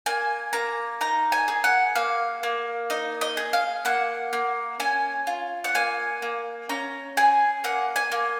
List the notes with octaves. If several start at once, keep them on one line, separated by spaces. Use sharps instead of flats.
A#3 G#5
A#3 A#5
D#4 A#5
G#5
G#4
F#5
A#3 F5
A#3
D#4 D#5
D#5
G#4
F5
A#3 F#5
A#3
C#4 G#5
F4
F#5
A#3 G#5
A#3
C#4 A#5
G#4 G#5
A#3 F#5
G#5
A#3